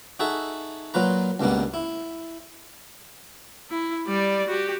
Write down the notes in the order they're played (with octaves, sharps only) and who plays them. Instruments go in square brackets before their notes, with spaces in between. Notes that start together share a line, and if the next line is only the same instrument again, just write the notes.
[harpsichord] D#4 F#4 G#4 A4 E5
A#2 F#3 F4 B4 A#5
C#2 G2 B2 A#3 B3
E4
[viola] E4
G3 D5
F#4 G4